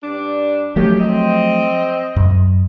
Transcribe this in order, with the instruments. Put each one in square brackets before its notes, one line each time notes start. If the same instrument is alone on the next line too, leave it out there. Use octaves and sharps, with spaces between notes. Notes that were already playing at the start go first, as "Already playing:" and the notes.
[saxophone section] G2 G3 D4
[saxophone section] D#3 C#4 G4 [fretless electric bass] F3 F#3 A3
[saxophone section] C4 D#5
[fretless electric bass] F#2